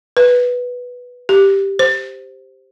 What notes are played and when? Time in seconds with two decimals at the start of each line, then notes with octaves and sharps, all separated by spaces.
0.17 B4
1.29 G4
1.79 C5